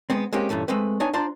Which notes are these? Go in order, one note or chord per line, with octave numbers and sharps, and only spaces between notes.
G#3 B3 C4
G#3 A#3 C4 C#4 G4
G2 A#2 E3 A3 C#4
G#3 A3 C4 B4
B3 D4 D#4 C#5 G#5
D4 F4 C5 D5 A#5 C6